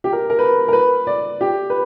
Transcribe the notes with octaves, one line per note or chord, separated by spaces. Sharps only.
G4
A#4
A#4
B4
A#4
B4
D5
G4
B4